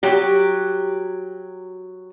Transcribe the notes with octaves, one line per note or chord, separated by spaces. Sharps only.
F#3 G4